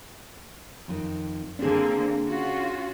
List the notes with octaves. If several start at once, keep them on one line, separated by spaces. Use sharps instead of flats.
F2 D#3
D3 A#3 C4 D4 G#4
C#4 F4 F#4